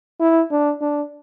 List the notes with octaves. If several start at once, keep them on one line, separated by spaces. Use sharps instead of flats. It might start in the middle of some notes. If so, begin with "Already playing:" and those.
E4
D4
D4